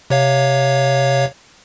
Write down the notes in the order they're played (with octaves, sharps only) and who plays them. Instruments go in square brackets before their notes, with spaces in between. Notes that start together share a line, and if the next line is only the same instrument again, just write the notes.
[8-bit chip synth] C3 C#5 F5